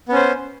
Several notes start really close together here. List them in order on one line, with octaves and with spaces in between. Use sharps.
B3 C#4 C5